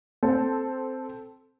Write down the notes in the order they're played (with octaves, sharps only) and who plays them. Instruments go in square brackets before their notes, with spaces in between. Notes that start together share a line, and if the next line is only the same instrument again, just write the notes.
[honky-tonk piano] C4 A4 A5